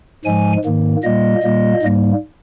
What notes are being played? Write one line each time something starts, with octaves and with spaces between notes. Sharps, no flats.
G#2 F3 G#3 G#5
G#2 D#3 A#3
A#2 G3 A#3 D#5
A#2 G3 A#3
G#2 G3 A#3